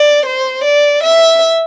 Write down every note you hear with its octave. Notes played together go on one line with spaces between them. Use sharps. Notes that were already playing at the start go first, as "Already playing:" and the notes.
Already playing: D5
C5
D5
E5